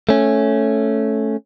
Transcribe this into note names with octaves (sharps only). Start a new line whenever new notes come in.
A3 C#4